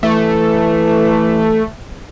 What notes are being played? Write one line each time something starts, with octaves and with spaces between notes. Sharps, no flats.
E3 A3